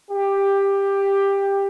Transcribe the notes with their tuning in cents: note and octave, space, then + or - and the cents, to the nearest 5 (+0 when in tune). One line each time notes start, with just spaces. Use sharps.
G4 +15